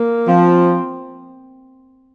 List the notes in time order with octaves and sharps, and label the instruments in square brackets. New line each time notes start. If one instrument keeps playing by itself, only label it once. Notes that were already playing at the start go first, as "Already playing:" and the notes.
Already playing: [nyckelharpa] A#3
[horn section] F3 [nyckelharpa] C4